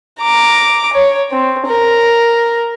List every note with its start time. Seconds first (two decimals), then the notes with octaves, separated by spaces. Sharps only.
0.20 A#5 D6
0.93 C#5
1.31 C4
1.66 A#4